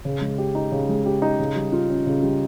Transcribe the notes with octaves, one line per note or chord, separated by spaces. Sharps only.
C#3
G#3
G4
D#4
C#3
G#3
G4
D#4
C#3
G3
F4
C#4
C#3
G3